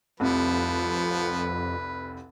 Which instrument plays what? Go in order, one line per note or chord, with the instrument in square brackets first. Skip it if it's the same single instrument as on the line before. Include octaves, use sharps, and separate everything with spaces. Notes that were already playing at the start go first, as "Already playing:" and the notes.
[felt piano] F1 C2 C3 [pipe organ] F2 [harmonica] F3 [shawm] B4